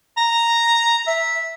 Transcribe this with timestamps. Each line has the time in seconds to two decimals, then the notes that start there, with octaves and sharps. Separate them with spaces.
0.17 A#5
1.07 E5